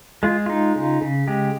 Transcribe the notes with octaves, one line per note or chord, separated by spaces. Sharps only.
G#3 F4
D#4 F4
C#3
C#3
G#3 G4